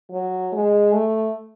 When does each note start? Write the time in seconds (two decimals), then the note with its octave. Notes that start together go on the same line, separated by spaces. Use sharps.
0.11 F#3
0.53 G#3
0.93 A3